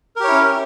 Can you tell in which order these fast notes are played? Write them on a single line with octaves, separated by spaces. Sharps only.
A#4 G4 C#5 E4 C#4